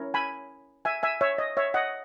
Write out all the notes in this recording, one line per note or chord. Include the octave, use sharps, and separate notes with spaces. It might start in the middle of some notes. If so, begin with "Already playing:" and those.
Already playing: C#4 E4 A#4 C#5
G#5 B5
E5 G#5
E5 G#5
C#5 E5
D#5
C#5 E5
D#5 F#5